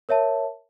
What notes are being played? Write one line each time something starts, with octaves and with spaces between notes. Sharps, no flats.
A#4 C#5 E5 A5